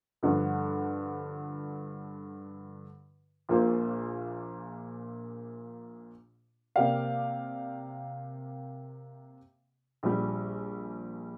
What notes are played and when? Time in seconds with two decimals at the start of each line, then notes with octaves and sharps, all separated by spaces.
0.23 G2 D3 F3
3.49 A#1 A#2 A#3 F4 C5
6.76 C3 A#3 G4 D5 F5
10.03 A#1 A#2 G3